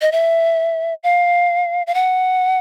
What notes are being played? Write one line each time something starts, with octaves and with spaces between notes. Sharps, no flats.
D#5
E5
F5
F5
F#5